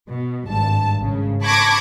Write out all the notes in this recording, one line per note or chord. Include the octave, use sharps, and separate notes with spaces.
B2
G#1 G2 A5
G#1 C#3
A5 B5 C#6 D6 G#6 A#6